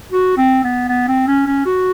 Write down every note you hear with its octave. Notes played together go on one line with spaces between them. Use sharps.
F#4
C4
B3
B3
C4
C#4
C#4
F#4